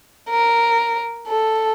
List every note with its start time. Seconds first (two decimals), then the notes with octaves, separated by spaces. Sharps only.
0.30 A#4
1.28 A4